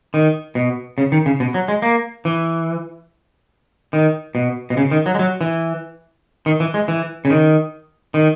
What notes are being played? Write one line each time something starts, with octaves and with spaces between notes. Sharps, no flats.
D#3
B2
C#3
D#3
C#3
B2
F#3
G#3
A#3
E3
D#3
B2
B2
C#3
D#3
F#3
G#3
F#3
E3
D#3
E3
G#3
E3
C#3
D#3
D#3